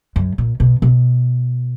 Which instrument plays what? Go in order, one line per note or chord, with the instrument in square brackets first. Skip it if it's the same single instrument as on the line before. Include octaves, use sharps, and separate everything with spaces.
[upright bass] F#2
A#2
B2
B2